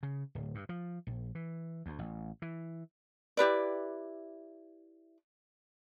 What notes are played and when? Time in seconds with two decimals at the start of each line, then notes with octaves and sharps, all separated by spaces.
0.03 C#3
0.35 D1
0.55 G2
0.69 F3
1.07 A#1
1.35 E3
1.86 D2
1.99 A1
2.42 E3
3.37 E4 G4 B4 D5